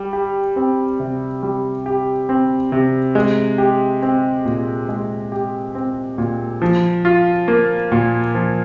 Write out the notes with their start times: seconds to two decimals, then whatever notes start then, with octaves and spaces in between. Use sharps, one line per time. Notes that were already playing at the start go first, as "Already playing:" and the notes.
Already playing: G3
0.13 G4
0.56 C4
1.00 C3
1.43 G3
1.86 G4
2.29 C4
2.72 C3
3.15 G#3
3.58 G4
4.02 C4
4.45 A#2
4.89 G#3
5.32 G4
5.75 C4
6.18 A#2
6.62 F3
7.05 F4
7.48 A#3
7.92 A#2
8.35 F3